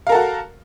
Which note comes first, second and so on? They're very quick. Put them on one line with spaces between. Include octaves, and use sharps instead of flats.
F5 A#4 A4 F#4